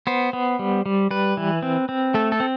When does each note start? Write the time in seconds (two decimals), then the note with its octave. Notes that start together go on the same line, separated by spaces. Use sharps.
0.07 B3 C5
0.33 B3
0.59 G3
0.86 G3
1.11 G3 B4
1.37 E3
1.63 C4
1.89 C4
2.14 A3 A4
2.32 A4
2.40 C4